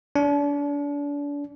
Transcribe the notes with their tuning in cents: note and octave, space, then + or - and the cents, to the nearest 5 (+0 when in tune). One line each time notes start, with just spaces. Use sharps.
D4 -35